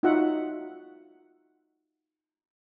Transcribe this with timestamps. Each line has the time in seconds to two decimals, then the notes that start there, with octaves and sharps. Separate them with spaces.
0.03 D#4 F4 F#4 E5 F#5